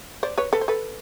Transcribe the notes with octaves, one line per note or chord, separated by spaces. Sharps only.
C5 D5
B4 C#5
A4 B4
C5
A4 B4